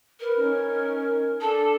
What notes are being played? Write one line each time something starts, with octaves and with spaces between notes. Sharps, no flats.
A#4 B4
C#4 D#4
D4 A4 A5